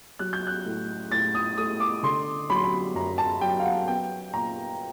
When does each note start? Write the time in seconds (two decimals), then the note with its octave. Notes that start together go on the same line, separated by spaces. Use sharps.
0.19 F#3 F#6
0.33 G6
0.47 F#6
0.65 A2
1.11 A2 A6
1.35 D#6
1.58 A3 D#6
1.80 D6
2.03 D3 C6
2.50 F#3 B5
2.56 C6
2.64 B5
2.95 F#2 A#5
3.18 A5
3.41 F#3 G5
3.60 F5
3.64 F#5
3.87 B3 G5
4.33 A#2 A#5